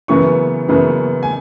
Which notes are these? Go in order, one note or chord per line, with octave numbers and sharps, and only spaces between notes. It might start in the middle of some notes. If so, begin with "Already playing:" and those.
F#2 C#3 E3 B3 C#6
F#2 C#3 E3 B3
G#5